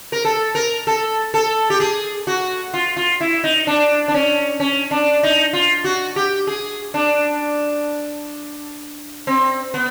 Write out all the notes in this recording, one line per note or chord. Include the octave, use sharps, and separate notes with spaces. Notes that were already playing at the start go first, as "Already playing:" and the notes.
A#4
A4
A#4
A4
A4
G4
G#4
F#4
F4
F4
E4
D#4
D4
D4
C#4
C#4
D4
D#4
F4
F#4
G4
G#4
D4
C4
B3